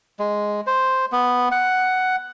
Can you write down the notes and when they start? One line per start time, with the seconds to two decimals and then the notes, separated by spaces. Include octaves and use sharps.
0.19 G#3
0.67 C5
1.12 B3
1.51 F#5